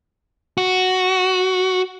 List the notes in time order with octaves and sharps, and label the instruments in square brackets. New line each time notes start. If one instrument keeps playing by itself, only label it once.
[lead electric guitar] F#4